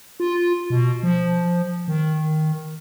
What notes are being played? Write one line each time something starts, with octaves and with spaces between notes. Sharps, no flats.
F4
B2
F3
D#3